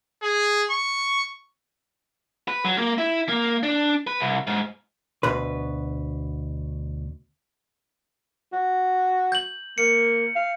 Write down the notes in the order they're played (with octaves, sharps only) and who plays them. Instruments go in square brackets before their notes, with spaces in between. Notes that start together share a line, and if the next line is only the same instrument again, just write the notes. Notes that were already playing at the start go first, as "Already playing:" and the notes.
[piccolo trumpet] G#4
C#6
[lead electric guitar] B4
F#3
A#3
E4
A#3
D4
B4
C2
G#2
[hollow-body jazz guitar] D2 B2 B4
[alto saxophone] F#4
[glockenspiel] G6 F#7
[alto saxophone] A#3 [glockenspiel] C#7
[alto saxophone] F5